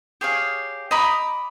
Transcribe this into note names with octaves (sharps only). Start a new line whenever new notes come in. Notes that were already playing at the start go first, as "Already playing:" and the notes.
G4 G#4 C#5 F5
D#5 A#5 B5 D6